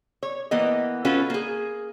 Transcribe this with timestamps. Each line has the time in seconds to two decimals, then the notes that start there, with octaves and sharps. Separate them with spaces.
0.23 C#5
0.51 E3 A#3 B3 D#5
1.05 C#4 F4 F#4 A4 B4
1.30 A#3 G#4